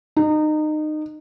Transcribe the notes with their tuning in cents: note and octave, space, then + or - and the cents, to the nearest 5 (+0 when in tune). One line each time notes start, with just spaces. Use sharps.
D#4 -25